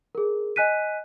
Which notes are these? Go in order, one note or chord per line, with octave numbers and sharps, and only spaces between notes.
G#4 A#4
D#5 G#5 F#6 B6 D#7